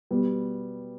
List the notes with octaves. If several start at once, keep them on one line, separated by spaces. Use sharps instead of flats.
B2 G3 B3